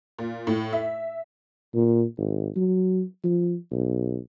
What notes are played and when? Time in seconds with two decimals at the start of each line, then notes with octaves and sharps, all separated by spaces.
0.18 A#2
0.47 A2
0.73 E5
1.74 A#2
2.18 G#1
2.56 F#3
3.24 F3
3.72 B1